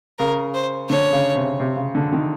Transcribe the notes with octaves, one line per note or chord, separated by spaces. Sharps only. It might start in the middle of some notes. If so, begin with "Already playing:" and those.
C#3 A#4
C5
D3 C#5
C#3
C3
C3
C#3
D3
D#3